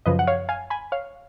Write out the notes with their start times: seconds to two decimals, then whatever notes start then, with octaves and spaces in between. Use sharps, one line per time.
0.06 F#2 C#3 F3 B4 D#5
0.19 F#5
0.27 C#5 F5
0.49 F5 G#5
0.70 G#5 B5
0.92 C#5 F5